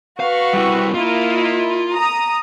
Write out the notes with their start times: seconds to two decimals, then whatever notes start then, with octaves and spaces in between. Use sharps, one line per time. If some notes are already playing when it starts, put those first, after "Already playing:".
0.20 F#4 B4 F5 C#6
0.53 G3 E4
0.94 A#3 E4 F4 D#5
1.94 A#5 D#6